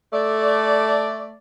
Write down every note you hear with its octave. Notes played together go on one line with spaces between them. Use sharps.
A3 D5